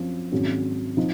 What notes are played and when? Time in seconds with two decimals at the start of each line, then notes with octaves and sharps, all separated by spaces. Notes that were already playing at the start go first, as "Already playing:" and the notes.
Already playing: F#2 F3 C4
0.32 G#1 G#2 F#3 C#4
0.97 F3 C4 D#4